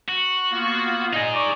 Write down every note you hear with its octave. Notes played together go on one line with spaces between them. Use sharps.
F#4
A#3 B3 F4
A#2 D#4 G#4 D#5
D5 C#6 D6